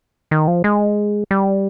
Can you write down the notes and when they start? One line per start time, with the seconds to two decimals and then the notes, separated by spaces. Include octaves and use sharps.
0.31 D#3
0.48 F3
0.64 G#3
1.31 G3